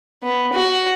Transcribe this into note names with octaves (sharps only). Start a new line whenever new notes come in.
B3
F#4